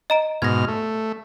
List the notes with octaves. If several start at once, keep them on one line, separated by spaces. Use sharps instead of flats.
D#5 A#5 D7
G#2 B2 F6 G#6 A#6
A3